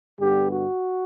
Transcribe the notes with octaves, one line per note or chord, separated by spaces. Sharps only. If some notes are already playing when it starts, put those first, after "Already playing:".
G2 D3 G3 B3 G4
F#4